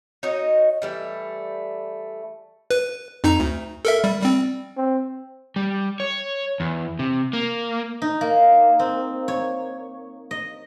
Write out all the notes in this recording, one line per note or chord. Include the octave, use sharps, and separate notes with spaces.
D#4 F#4 C#5 D#5
E3 G3 A3
B4
F2 D#4 A#5
D2
A4 A#4 E5
G3
G3 C4
C4
G3
C#5
E2
C3
A#3
D#4
A#3
C4
C#5
D#5